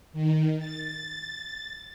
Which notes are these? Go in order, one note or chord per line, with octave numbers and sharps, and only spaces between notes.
D#3
A6